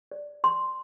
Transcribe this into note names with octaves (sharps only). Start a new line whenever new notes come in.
D5
C6